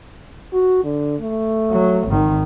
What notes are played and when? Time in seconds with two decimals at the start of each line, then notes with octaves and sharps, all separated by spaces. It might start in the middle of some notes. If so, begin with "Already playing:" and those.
0.53 F#4
0.84 D3
1.21 A3
1.71 F#3
2.07 G#1 D#3